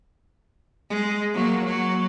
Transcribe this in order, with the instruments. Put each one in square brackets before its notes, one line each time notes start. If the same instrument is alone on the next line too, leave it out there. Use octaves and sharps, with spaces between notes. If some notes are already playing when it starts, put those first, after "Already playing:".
[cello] G#3
F#3 A#3
F#3